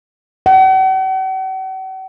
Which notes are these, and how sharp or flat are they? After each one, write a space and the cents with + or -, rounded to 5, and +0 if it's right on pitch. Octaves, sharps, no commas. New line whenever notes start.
F#5 +45